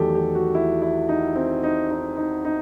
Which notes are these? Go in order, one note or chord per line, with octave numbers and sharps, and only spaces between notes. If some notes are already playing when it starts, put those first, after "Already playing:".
Already playing: E2 D#3 F#3 A3 G4 A4
G4
F#4
E4
E4
D#4
C4
D#4
D#4
D#4
D#4